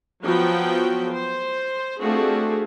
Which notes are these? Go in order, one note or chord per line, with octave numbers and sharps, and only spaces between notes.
F3 F#3 B3 F#4 G5
C5
A3 C4 D4 F4 F#4 G#4